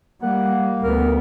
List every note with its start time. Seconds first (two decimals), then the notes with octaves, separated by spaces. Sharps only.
0.22 G3 A#3 F#5
0.82 D2 B3 A#4